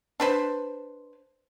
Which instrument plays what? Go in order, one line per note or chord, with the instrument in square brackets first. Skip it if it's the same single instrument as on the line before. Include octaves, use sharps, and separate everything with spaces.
[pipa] D4 B4 C5